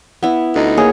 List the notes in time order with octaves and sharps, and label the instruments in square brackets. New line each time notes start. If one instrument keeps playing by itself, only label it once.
[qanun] B3 E4
[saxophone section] D2 D#4
[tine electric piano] A#3 G#4 [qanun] A#4 C#5